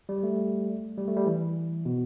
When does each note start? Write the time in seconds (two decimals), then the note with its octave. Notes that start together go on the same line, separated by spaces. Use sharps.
0.09 G3
0.23 A3
0.98 G3
1.08 A3
1.17 G3
1.26 E3
1.85 B2